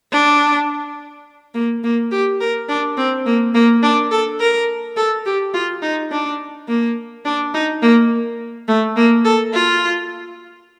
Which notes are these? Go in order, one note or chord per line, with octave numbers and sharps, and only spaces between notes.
D4
A#3
A#3
G4
A#4
D4
C4
A#3
A#3
D4
A4
A#4
A4
G4
F4
D#4
D4
A#3
D4
D#4
A#3
A3
A#3
A4
F4